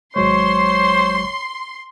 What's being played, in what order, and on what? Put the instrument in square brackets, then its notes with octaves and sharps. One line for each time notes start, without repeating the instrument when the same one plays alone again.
[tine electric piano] G#1 F#3 G#3 [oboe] C5 [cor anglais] C#5 [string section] C6